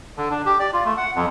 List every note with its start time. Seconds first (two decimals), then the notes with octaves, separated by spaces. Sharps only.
0.17 D3
0.31 D4
0.46 G4
0.60 D5
0.73 F4
0.85 A3
0.97 F#5
1.15 F2